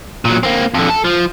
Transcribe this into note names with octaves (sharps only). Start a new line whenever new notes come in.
A#2 F#3
A#3 C4
F2 D3
A4
F3